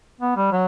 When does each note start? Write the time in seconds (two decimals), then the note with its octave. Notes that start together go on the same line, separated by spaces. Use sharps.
0.20 B3
0.36 G3
0.52 F#3